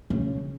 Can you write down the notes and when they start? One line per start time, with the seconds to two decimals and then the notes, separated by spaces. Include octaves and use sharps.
0.10 C#3